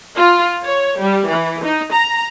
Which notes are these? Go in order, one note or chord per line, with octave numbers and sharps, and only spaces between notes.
F4
C#5
G3
E3
D#4
A#5